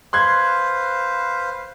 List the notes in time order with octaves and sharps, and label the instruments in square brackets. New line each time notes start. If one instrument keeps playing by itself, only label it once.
[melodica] B4 C5 F5 [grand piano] C6 F#6 G#6